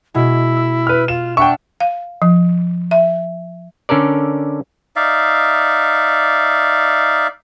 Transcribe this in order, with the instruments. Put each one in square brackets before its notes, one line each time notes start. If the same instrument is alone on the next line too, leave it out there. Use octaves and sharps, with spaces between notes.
[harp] B2 G#3 [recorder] E4
[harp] E6
[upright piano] B4 F6
[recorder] F4 [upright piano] E7
[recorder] D4 [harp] E5 F#5 [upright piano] G5 C#6
[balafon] F5
F3
E5
[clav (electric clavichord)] D3 C#4 A4 A#4 D5
[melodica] D#4 D5 E5 F5